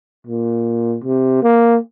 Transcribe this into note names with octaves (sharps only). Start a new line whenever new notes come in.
A#2
C3
A#3